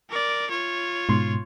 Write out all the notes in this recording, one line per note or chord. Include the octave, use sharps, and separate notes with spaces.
A#4 D5
F4 C#5
G#2 B2 C6